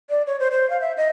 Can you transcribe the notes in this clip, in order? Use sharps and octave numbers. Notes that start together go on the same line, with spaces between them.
D5
C#5
C5
C5
F5
E5
D#5